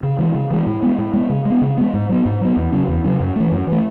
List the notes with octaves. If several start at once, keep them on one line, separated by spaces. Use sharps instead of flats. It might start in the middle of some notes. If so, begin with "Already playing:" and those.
C#3
E3 G#3
C#3
E3 G#3
A2
G#3 B3
A2
G#3 B3
C#3
G#3 B3
C#3
G#3 B3
G#2
F#3 B3
G#2
F#3 B3
E2
C#3 F#3 C#4
E2
C#3 F#3 C#4
F#2
E3 A3
F#2
E3 A3